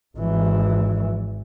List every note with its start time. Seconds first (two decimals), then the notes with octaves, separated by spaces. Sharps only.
0.17 G#1 E3